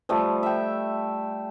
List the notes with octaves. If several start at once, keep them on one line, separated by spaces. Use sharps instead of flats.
F3 G3 A3
E5 G5